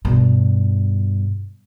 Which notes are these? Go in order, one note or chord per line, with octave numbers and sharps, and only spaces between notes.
G2 B2